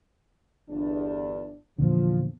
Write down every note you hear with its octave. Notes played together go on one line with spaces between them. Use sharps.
G1 E2 D4
E2 A#2 D3 F3